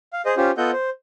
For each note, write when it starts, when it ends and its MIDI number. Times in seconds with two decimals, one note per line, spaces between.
0.13 0.22 77
0.25 0.35 68
0.25 0.35 72
0.25 0.35 75
0.37 0.51 61
0.37 0.51 65
0.37 0.51 67
0.37 0.51 72
0.57 0.71 59
0.57 0.71 65
0.57 0.71 69
0.57 0.71 75
0.57 0.71 78
0.57 0.71 91
0.72 0.90 72